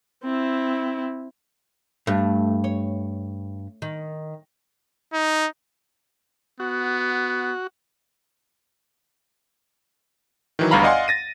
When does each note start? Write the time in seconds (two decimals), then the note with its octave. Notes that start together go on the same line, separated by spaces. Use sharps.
0.24 C4 E4
2.07 G2 A3
2.64 C#5
3.82 D#3
5.13 D#4
6.60 B3 F#4
10.59 D#3 E3 F#3
10.71 G1 D2 G2 F5 A#5 B5
10.83 D5 D#5 F5 F#5 G#5 C6
11.08 A6 A#6 D#7